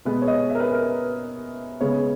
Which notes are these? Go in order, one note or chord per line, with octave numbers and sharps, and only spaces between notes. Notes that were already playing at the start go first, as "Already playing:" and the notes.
B2 G#3 B3 B4
C#5
D#5
E5
A#4
B4
A#4
B4
C#3 G#3 B3 C#5